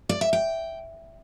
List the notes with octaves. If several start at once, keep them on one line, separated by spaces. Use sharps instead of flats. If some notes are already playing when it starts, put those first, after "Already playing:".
D5
E5
G5